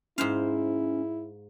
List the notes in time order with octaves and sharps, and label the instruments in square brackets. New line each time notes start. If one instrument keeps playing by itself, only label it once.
[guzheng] G#2 C5 F5 [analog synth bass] C#4 [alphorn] E4